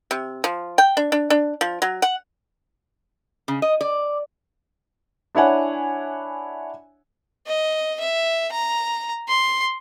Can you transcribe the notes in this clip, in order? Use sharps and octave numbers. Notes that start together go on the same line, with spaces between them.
C3
F3
G5
D4
D4
D4
F3
F#3
F#5
C#3
D#5
D5
D4 E4 C#5 F#5 G#5
D#5
E5
A#5
C6